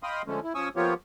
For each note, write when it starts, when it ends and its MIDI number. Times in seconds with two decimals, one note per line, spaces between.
0.03 0.22 75
0.03 0.22 77
0.03 0.22 79
0.03 0.22 83
0.03 0.22 84
0.03 0.22 87
0.27 0.40 50
0.27 0.40 53
0.27 0.40 56
0.27 0.40 57
0.27 0.40 61
0.43 0.53 64
0.55 0.69 53
0.55 0.69 61
0.55 0.69 80
0.55 0.69 85
0.55 0.69 87
0.55 0.69 88
0.76 0.94 53
0.76 0.94 58
0.76 0.94 59
0.76 0.94 65
0.76 0.94 67
0.76 0.94 73